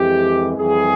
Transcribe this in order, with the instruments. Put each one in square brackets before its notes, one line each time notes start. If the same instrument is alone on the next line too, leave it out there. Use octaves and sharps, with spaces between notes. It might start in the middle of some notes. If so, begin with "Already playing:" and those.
Already playing: [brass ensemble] F2 E3 G#3 G4
F2 E3 G3 G#4